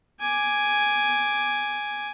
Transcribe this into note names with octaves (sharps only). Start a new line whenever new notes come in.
G#5 D6